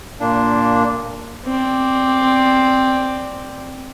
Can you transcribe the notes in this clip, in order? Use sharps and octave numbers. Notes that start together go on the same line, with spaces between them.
A#2 A#3 D4
C4 D5